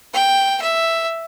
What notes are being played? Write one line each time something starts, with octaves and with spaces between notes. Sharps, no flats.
G5
E5